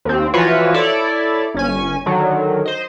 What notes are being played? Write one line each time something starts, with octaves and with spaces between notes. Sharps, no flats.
D#2 C4
E3 F3 F4 F#4 B4 C#5
E4 A4 C#5 D5
G1 C#4 G#5
D3 D#3 F#3
C5 D#5